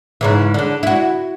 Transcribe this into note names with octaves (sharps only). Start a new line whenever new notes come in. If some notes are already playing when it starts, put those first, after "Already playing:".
G#2 C#3 E3
D3 D4
E4 F#4